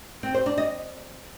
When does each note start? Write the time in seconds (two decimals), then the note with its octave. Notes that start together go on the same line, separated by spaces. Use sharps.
0.23 C4
0.35 C5
0.46 D4
0.58 D#5